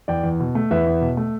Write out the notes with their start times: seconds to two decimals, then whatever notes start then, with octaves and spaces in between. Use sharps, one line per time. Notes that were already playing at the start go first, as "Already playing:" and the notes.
0.08 E2 D5 G5
0.23 E2
0.40 B2
0.55 A3
0.71 E2 B4 E5
0.86 E2
1.02 B2
1.17 A3